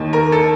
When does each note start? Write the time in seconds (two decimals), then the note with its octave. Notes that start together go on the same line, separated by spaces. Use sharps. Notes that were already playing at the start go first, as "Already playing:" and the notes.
Already playing: D#2 D#3
0.13 A#4
0.32 A4